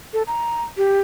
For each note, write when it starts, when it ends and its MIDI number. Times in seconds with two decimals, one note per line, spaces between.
0.13 0.22 69
0.27 0.62 82
0.77 1.01 67